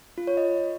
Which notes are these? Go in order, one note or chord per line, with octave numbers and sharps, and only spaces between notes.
F4
C#5
D#5